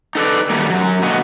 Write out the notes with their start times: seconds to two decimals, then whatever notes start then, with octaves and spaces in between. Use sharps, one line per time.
0.15 D#4 A4 B4 D5
0.50 D#3 F#3 G3 A3 A#3
0.70 F#2 F#3
1.02 D3 A#3 B3 F#4 D#5